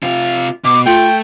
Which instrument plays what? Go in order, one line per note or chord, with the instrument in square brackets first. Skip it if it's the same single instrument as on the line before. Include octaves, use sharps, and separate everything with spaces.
[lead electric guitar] C3 F4
[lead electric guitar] B2 [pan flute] D6
[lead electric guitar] A3 [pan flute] F4 [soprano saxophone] G5